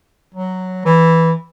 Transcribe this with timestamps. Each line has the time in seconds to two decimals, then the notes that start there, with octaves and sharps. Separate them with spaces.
0.34 F#3
0.85 E3